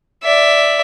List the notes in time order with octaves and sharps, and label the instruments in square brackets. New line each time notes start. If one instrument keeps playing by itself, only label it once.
[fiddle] D5 E5